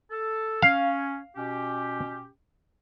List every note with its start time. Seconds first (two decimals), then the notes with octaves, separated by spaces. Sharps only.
0.11 A4
0.62 C#4 F5
1.36 B2 C#4 G4